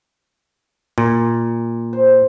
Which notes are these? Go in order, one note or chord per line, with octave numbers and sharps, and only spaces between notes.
A#2
C5